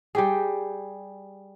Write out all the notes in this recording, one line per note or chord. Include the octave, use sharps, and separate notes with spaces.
G3 G4 G#4